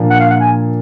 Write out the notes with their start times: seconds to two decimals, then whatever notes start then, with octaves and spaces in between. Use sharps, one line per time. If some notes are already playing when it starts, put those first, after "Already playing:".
Already playing: A#2 F3 A#3 D4
0.10 F#5
0.20 F5
0.30 F#5
0.41 G#5